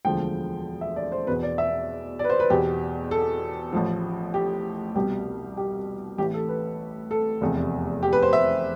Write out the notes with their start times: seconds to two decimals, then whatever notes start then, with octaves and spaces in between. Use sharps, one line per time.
0.05 E1 D2 D3 F3 G5
0.81 E5
0.96 D5
1.12 C5
1.27 E2 B2 B4
1.43 D5
1.58 E5
2.19 D5
2.24 B4
2.30 C5
2.40 B4
2.50 E2 B2 G4
3.11 A4
3.73 A1 A2 F3
4.34 G4
4.95 C2 B2 G4
5.57 G4
6.18 A1 A2 E3 G4
6.34 A4
6.49 B4
7.11 A4
7.41 F1 E2 C3
8.03 G4
8.13 B4
8.22 C5
8.33 E5